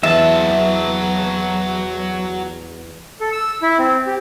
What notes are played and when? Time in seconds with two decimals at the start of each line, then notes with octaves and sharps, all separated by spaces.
0.03 E2 F#3 E5 A5
3.20 A4
3.33 E6
3.62 E4
3.79 C4
4.07 G4